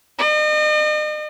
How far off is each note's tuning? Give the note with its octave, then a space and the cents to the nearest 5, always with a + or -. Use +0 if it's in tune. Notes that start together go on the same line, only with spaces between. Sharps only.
D#5 -40